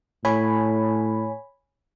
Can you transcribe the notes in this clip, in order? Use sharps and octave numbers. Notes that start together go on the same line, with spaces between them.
A2 C#5 G#5 B5